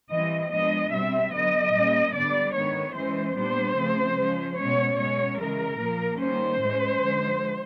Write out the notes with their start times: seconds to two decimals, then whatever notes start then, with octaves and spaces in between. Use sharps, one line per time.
0.10 E3 G3 C4 D#5
0.51 F3 G#3 B3 D4 D#5
0.92 B2 G3 C4 E5
1.32 D3 F#3 B3 D#5
1.73 A#2 G3 A#3 C#4
2.13 D3 G3 B3 D4 D5
2.53 D#3 G#3 B3 C#5
2.94 E3 G#3 C#4 C5
3.35 A#2 G3 B3 D4 C5
3.76 C#3 F3 A3 C4
4.16 F3 G#3 C#4
4.57 B2 G#3 C#4 C#5
4.98 B2 G#3 C#4 C#5
5.38 C#3 E3 G#3 A#4
5.78 A#2 F3 A#3
6.19 D#3 G3 A#3 C#4 C5
6.60 A2 E3 G#3 C#4
7.00 D3 F3 G#3